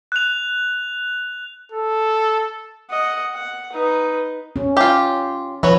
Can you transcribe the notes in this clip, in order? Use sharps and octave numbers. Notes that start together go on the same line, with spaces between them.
F#6 F7
A4
D#5 F#5
F#5
D#4 B4
C#4
F4 G4
F3 F#3 B3 C#5